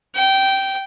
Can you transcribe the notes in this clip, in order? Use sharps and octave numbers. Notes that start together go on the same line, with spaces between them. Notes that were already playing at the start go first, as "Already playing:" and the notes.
G5